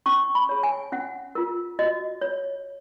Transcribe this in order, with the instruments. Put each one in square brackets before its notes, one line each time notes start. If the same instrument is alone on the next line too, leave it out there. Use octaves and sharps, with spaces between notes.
[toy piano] C#4 C#6
B5
G#4 C#5
G#5
C#4 F#5
F4 A#4
F#4 D#5
C#5